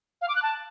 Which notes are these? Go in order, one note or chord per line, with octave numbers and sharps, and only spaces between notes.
F5
D6
F#6
A5